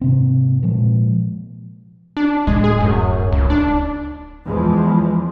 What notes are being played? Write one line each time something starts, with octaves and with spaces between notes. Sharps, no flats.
G#2 C3 C4
A#2 F3 G#3
D4
D1 G#3
G#4
F#2
C#2
D4
E2 F3 G#3